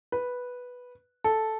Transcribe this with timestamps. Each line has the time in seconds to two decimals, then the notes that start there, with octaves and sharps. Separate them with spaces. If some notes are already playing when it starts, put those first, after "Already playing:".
0.12 B4
1.24 A4